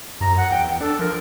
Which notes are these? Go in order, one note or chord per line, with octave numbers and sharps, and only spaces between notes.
F#2 A#5
F#5
E2 G5
D4 A4
F3 A#4